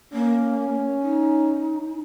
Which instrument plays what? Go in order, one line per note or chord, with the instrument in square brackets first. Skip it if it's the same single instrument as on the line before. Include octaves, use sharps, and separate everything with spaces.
[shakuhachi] A#3 [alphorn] C#4
[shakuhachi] D#4